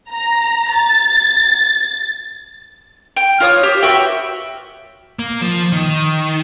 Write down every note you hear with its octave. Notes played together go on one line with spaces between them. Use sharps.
A#5
A6
G5
F4 C#5 D#6
G4 C5
F#4 B4 E5 G5
A#3
F3
D#3